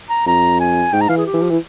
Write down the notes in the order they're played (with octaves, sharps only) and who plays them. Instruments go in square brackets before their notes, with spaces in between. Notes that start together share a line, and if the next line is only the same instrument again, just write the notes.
[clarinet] A#5
[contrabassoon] F2 [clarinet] A#5
[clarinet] G#5
[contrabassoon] G#2 [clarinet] G5
[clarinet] A#5
[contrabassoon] E3 [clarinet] F5
[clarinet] G#4
G4
[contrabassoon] E3
F3
[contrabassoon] E3 [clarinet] E4